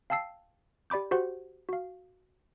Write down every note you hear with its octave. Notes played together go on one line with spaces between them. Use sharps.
F5 G5 A5 E6 C7
G4 D5 B5 D6 G6
F#4 G4 C5 F#5
F#4 F5